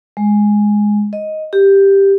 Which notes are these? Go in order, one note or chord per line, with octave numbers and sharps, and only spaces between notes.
G#3
D#5
G4